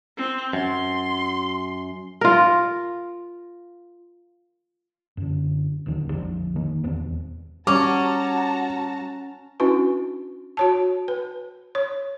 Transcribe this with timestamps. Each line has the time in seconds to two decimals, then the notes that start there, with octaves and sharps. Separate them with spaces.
0.17 C4
0.53 F#2 C6
2.21 F4 A#4
5.17 F#2 D3
5.86 D#1 D2 D#3
6.13 A#1 F2 F3 D4
6.56 D#3 A#3
6.84 D#1 E2 B3 C4
7.67 G3 C#4 F#4 A5 A#5 D6
9.60 C#4 D4 E4 F#4 B4
10.57 F#4 C#5 A5
11.08 B4
11.75 C#5